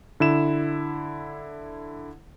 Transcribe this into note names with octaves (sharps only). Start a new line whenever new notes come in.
D3 E4 E7